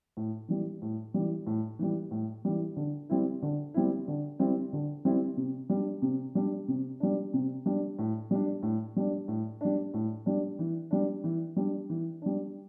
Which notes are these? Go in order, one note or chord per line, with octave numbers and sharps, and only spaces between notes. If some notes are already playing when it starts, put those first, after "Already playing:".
A2
E3 G3
A2
E3 G3
A2
E3 G3
A2
E3 G3
D3
G3 C4 E4
D3
G3 C4 E4
D3
G3 C4 E4
D3
G3 C4 E4
C3
G3
D4
C3
G3 D4
C3
G3 D4
C3
G3 D4
A2
G3 D4
A2
G3 D4
A2
G3 D4
A2
G3 D4
E3
G3 D4
E3
G3 D4
E3
G3 D4